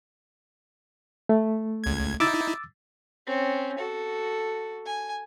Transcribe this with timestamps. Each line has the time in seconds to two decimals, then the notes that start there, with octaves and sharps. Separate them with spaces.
1.29 A3
1.84 C#2 G#6
2.20 D#4 E4 D6 E6 A6
3.26 C4 C#4
3.78 F#4 A4
4.86 G#5